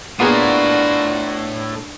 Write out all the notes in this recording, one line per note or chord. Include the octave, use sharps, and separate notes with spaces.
A2 B3 D4 F4 F#4 G#4 A#4